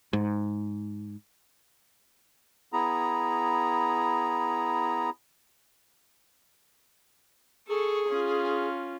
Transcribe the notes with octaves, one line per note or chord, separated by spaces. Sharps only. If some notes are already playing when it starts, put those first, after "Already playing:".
G#2
B3 E4 G#4 A#5
G#4 A4 C#6
C#4 F4